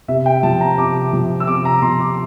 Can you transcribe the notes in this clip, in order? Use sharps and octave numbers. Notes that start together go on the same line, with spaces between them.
C3 E5
G5
F3 A5
A#5
C3 D6
F3
E6
C3 D6
A#5
F3 C6
D6